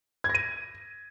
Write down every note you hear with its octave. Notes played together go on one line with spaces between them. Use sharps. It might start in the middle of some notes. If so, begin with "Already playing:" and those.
G#6
A#6
D#7